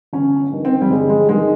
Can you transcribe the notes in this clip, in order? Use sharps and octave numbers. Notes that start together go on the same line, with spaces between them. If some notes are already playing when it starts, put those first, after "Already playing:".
G1 C#4
G2 D#3
C4
G3
G1 G#3
G#3
G2 D#3 G#3